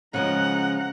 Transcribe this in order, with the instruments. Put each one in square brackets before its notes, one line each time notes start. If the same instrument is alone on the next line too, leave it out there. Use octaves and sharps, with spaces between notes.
[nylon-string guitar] C#3 F3 G#3 [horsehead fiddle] F#5 A#5